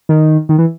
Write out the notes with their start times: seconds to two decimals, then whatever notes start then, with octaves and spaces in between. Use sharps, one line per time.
0.09 D#3
0.49 D#3
0.58 E3